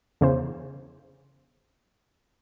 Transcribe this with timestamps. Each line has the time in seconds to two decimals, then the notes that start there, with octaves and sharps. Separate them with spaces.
0.21 E2 C#3 C5